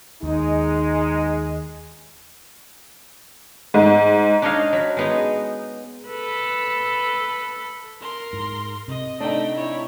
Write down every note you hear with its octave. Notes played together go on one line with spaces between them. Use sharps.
D#2 G#3 D#4
G#2
D4 D#4 C#5 D#5 F5
F#3 B5
G#3 B3 D#4
A4 B4
A#4 C6
G#2
C3 D#5
A3 D4 D#4 G5
E4 C#5